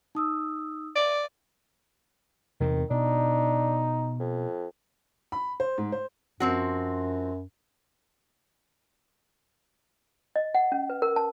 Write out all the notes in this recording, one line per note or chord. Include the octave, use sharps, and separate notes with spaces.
D#4 D#6 E6
D5
E2 C3 D#3 C4
B2 D4 D#4
F2
B5
C5
G#2
C5
F#2 F3 C4 F#4
D#5
F#5
C#4
B4
A#4
A5